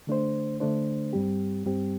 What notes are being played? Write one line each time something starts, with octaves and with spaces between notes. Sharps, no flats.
D3 A3 D4 C5
D3 A3 D4 C5
G2 G3 C4 G4
G2 G3 C4 G4